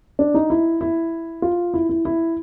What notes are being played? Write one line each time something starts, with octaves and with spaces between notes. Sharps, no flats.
D4
D#4
E4
E4
F4
E4
E4
E4